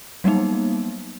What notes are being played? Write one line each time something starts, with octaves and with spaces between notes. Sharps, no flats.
F#3 G3 A#3 B3 D#4